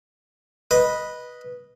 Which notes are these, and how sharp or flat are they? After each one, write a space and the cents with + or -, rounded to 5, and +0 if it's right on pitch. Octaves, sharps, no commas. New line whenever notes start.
B4 -10 D#5 +0